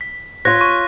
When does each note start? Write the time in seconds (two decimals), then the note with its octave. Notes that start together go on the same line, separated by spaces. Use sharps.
0.01 B6
0.45 F4 C#5 F#6 A#6
0.61 C#6